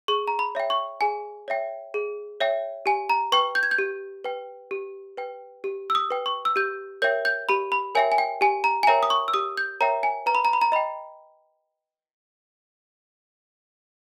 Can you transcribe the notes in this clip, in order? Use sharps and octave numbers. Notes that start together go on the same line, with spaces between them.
G#4 C#6
A#5
B5
C#5 E5 G5
C#6
G#4 G#5
C#5 E5 G5
G#4
C#5 E5 G5
G4 G#5
A#5
B4 G5 C#6
G6
G#6
G6
G4
B4 G5
G4
B4 G5
G4
E6
D#6
B4 G5
C#6
E6
G4 G6
A#4 C#5 E5 G5 G6
G6
G4 B5
B5
A#4 C#5 E5 G5 G#5
G#5
G5
G4 G#5
A#5
G#5
A#4 C#5 E5 G5 A#5
D#6
C#6
E6
G4 D#6
G6
A#4 C#5 E5 G5 A#5
G#5
B4 A#5
B5
A#5
B5
A#5
D#5 G5 B5